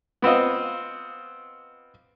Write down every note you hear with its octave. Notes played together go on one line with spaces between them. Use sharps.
B3 C4 F4 D#5